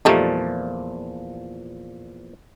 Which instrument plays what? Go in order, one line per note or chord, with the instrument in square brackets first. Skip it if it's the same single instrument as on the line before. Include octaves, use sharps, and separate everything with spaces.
[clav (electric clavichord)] E2 A#2 F3 [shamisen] G3 A3 D#4